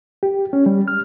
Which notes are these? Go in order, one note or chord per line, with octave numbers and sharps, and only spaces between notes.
G4
C#4
G3
F6